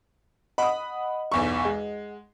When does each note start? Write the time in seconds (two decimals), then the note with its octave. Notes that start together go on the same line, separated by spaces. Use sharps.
0.58 D#5 F#5 B5 D#6
1.32 B1 E2 C#6
1.65 G#3